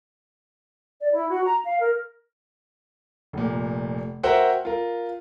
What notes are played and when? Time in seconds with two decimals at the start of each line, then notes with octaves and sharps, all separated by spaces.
1.00 D5
1.12 E4
1.29 F#4
1.43 A#5
1.63 F5
1.80 A#4
3.33 F1 A#2
4.23 F#4 A#4 C5 E5 F#5 G5
4.65 F4 A#4